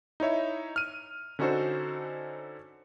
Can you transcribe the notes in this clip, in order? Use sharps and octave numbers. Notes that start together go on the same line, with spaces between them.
D#4 E4 C#5 E5
F6 D#7
D3 C#4 D#4 F#4 A4 C5